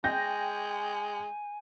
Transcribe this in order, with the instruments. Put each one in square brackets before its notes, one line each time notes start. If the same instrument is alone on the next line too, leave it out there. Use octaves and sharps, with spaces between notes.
[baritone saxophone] G#3 [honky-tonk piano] G5 G6 A#6 [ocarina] G#5